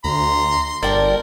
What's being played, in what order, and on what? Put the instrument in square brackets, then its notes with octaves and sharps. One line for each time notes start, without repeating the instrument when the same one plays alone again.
[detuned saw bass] D2 [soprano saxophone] A#5 [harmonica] C6
[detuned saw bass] G1 [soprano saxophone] A#4 [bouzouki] D5 G5 A5